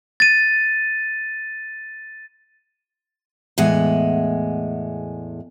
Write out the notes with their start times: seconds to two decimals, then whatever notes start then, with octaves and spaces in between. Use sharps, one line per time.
0.20 A6 D#7
3.58 E2 A2 G#3 F#5